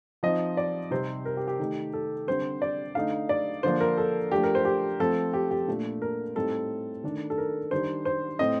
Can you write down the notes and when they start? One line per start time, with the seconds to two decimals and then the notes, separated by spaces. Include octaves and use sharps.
0.23 F3 C4 D#4 D#5
0.57 D5
0.91 C3 G3 C4 D#4 C5
1.25 A#4
1.37 G4
1.47 G4
1.59 D#3 A3 D#4
1.93 A4
2.27 D3 G3 C4 C5
2.62 D5
2.95 D3 A3 D#4 F5
3.29 D5
3.63 D3 F3 A#3 D4 C5
3.80 A#4
3.98 A4
4.32 F3 A3 D4 G4
4.43 A#4
4.55 C5
4.65 G4
5.00 F3 A3 C4 A4
5.33 G4
5.51 G4
5.68 A#2 A3 D4
6.02 A#4
6.35 A2 G3 C4 D#4 A4
7.03 D#3 A3 D4
7.30 A4
7.38 A#4
7.71 D#3 G3 D4 C5
8.05 C5
8.39 A2 A3 C4 D#5